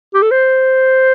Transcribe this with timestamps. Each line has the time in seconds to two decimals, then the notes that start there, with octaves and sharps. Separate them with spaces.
0.14 G4
0.22 A4
0.31 C5